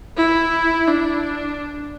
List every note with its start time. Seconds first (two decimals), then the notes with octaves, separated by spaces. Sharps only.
0.17 E4
0.88 D4